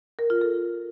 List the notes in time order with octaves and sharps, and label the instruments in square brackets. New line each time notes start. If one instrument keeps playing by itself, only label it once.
[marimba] A#4
F4
A4